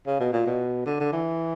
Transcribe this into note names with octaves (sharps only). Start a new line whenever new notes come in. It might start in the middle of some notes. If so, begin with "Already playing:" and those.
C#3
B2
A#2
B2
D3
D3
E3